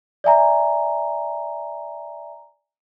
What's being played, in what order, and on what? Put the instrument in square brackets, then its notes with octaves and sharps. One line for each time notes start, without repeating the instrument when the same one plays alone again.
[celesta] D5 E5 G#5 A#5